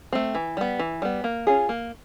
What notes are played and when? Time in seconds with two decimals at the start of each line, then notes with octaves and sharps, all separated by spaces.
0.13 A3 C4
0.35 E3
0.57 G3 B3
0.79 E3
1.02 G3 B3
1.24 A#3
1.47 C#4 F4 G#4
1.69 A#3